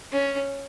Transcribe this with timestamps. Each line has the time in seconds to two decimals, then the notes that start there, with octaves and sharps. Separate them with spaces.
0.12 C#4